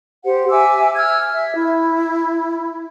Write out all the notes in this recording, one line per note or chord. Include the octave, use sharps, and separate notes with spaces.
G4 C5 F#5
E5 G#5 D6 E6
E6 F6 G#6
E5
E4